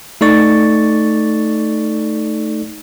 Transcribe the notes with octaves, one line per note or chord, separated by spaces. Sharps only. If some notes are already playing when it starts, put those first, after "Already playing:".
A3 D#4 A4 D5 C#6 A6